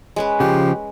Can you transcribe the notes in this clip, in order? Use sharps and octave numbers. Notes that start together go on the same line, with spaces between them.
G#3 C#4 B4
C#3 F3 G4